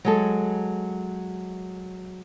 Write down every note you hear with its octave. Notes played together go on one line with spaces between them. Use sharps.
F#3 G#3 A4